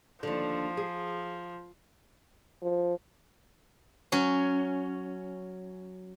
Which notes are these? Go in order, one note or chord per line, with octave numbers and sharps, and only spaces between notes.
D#2 D3 F3
G#4
F3
F#3 C#4